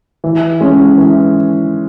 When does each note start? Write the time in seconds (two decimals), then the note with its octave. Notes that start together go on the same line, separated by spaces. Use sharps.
0.24 E3
0.61 G#3 C#4
0.98 E3